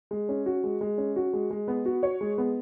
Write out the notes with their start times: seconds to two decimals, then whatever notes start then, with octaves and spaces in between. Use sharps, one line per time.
0.11 G#3
0.29 C#4
0.46 F#4
0.64 G#3
0.81 G#3
0.98 C#4
1.16 F#4
1.33 G#3
1.51 G#3
1.68 B3
1.86 F#4
2.03 C#5
2.21 G#3
2.38 B3